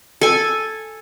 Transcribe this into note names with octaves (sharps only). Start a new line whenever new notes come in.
A4 G#5